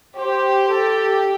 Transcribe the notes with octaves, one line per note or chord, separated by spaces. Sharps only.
G4 C5
A4